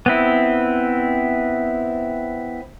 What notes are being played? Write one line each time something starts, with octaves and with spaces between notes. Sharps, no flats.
B3 C4 E4